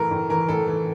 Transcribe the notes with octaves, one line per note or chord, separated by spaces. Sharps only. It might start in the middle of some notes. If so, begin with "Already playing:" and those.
Already playing: A2 E3 A4 A#4
A2
E3 A#4
A2 A4
E3